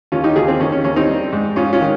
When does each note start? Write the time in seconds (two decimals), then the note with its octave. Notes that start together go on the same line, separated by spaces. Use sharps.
0.12 D#2 C#4 F4
0.24 D#4 G4
0.36 D#2 F4 G#4
0.48 C4
0.60 D#2 C#4
0.72 C#4
0.84 D#2 C#4
0.96 C4 D#4
1.09 G3
1.32 G#2
1.56 G#2 C#4 F4
1.73 C#4 F4
1.81 D#3